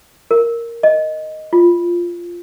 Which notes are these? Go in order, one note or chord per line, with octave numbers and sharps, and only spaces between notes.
A#4
D#5
F4